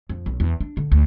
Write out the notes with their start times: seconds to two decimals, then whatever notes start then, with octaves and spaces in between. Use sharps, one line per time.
0.09 F2
0.26 B1
0.40 E2
0.60 D4
0.77 D3
0.92 D2